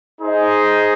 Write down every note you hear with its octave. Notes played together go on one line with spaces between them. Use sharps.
D#4 G#4 C5 D#5